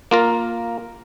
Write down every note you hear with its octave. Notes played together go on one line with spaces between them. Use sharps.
A#3 F4 A#4